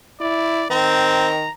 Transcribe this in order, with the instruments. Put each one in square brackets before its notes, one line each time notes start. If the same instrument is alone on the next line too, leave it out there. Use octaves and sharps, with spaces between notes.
[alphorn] E4 [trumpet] D5
[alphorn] D#3 [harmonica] C4 [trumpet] A#5